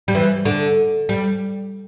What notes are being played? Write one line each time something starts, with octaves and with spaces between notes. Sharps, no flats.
G3
E3
D3
G3